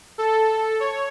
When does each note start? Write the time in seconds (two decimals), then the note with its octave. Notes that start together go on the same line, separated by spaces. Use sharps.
0.18 A4
0.80 C#5